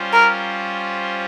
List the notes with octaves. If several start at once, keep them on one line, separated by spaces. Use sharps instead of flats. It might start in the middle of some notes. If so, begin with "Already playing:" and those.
Already playing: G3 C#4 F4 C5
A#4